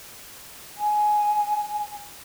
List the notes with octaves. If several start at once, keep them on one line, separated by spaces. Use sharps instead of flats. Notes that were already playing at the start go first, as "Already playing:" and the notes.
G#5